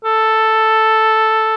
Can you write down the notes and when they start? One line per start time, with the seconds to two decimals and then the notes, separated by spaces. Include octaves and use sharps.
0.05 A4